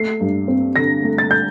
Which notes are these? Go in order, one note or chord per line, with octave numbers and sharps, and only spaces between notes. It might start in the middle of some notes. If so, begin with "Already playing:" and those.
Already playing: A3 C7
G2
C4
D3 A#6
A3
A6
G6